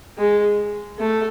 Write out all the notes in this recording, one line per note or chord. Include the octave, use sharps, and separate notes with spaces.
G#3
A3